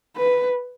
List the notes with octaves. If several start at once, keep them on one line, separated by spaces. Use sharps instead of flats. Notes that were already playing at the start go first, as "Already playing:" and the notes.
B4